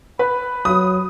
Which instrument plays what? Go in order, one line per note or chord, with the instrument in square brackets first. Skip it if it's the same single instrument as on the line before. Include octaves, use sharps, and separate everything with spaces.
[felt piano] B4 [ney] B5
[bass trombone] F#3 [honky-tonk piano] D#6